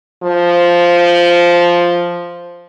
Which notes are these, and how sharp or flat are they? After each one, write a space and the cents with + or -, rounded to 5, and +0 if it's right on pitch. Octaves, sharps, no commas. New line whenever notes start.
F3 -5